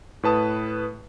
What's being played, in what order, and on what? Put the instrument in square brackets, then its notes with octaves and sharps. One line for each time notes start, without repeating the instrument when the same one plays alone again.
[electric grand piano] A2 B4 A5 D#6